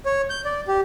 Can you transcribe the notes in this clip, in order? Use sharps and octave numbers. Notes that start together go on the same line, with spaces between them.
C#5
G6
D5
G4